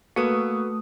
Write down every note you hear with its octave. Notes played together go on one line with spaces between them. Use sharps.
A3 A#3 F#4 A4 B4 D#6